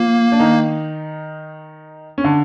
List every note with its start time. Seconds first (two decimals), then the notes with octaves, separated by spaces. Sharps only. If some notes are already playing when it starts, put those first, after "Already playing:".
Already playing: F3 A#3 F4
0.32 D4
0.39 D#3 D#4
2.18 C#4
2.24 D3 D4